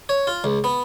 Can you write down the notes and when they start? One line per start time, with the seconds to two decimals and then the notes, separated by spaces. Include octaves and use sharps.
0.09 C#5
0.27 F4
0.44 C#2
0.64 B3